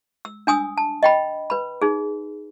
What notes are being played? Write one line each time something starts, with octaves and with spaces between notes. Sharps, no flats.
E6
D4 G#5 D#6 E6
A5
D#5 G5 B5
B4 B5
D#4 G#4